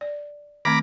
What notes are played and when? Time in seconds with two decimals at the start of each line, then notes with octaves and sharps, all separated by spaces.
0.01 D5
0.65 D#3 A3 C4 A#5 B5 D6